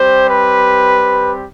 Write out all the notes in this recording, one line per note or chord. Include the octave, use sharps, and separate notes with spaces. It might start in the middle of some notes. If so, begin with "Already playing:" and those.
Already playing: G3 C4 G4 C5
B4